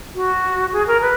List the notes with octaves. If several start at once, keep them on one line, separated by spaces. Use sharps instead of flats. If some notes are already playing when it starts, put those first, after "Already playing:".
F#4
G#4
A#4
B4